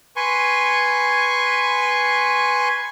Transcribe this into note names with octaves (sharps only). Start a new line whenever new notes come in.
B4 G#5 C6 C#6